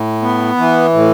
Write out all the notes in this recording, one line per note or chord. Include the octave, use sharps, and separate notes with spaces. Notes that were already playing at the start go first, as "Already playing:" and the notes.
Already playing: A2
B3
E3
A2